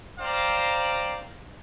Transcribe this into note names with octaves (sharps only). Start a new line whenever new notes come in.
C5 D5 F5 G5 A#5